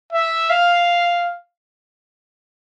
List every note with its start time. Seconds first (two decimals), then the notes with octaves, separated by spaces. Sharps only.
0.13 E5
0.50 F5